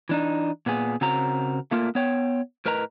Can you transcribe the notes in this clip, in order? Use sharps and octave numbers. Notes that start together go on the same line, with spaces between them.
E3 D4 D#4
A#2 B3 G#4
C#3 C4 F#4 A#4 A#5
A3 A#3 F4 A#4
B3 C#5 G5
A2 A#4 B4 D#5 A#5